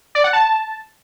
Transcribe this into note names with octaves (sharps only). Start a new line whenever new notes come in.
D5
F#5
A5